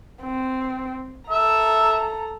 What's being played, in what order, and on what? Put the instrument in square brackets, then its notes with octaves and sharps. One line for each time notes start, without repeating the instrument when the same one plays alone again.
[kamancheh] C4
[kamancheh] A4 A#5 [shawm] E5